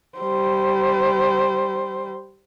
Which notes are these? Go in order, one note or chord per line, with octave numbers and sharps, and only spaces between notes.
G3 C5